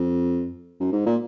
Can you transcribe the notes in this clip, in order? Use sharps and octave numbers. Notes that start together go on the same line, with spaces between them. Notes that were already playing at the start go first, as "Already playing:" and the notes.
Already playing: F2
F#2
G#2
A#2